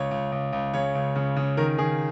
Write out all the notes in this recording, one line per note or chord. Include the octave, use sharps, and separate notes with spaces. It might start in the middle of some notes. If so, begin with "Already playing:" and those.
Already playing: C#2 C#5
C#2
C#2
C#2
C#3 C#5
C#2
C#3
C#3
D#3 A#4
D#3 G#4